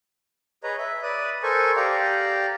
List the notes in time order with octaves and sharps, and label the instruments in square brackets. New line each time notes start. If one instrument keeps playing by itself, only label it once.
[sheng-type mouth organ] G#4 B4 C#5 D#5 A#5
E5
B4 D5 D#6
A4 A#4 C5 G#5 C#6
G4 D5 F5 G5 A#5